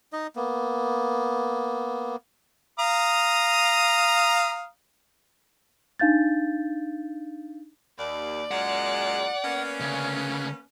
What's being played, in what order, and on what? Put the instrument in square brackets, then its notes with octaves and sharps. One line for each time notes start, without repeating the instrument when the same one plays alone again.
[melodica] D#4 D#5
A#3 B3
[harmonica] F5 A#5 D#6
[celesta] D4 D#4 F5 G6 A6
[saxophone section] D#2 [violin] D5
[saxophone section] F#2 A#2 G#3 [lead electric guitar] F#5
[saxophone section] A#3 B3 C#4
[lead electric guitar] D2 C#3